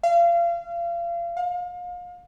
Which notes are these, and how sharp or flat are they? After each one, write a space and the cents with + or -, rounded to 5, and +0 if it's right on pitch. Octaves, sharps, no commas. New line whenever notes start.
F5 -30
F5 +35